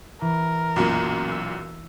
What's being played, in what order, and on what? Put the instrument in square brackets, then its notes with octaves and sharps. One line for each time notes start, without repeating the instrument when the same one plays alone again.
[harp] E3 [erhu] A#4
[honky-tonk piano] B1 F#2 A#2
[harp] E6 B6